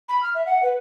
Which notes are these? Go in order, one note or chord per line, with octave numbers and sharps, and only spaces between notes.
B5
F6
E5
F#5
B4